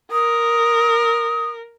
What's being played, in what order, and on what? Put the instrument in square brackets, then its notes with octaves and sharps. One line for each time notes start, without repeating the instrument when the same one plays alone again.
[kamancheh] A#4 [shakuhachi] D#6